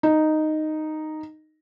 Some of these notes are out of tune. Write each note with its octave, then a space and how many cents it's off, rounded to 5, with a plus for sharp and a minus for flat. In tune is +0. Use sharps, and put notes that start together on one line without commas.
D#4 -5